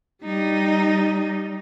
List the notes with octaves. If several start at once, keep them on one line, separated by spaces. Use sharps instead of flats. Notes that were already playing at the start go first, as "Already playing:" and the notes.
G3 D#4